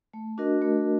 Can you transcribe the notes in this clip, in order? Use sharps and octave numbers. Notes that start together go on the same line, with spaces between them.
A3
D4 F#4 A#4 D#5
A3